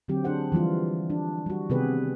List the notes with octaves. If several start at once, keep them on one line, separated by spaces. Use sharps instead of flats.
D3 F#3 C4 G4
D4 G#4 C5 F#5
E3 F3 G3 F4
D4
G3 F#4
C3 D#3 B3 G4 G#4 B4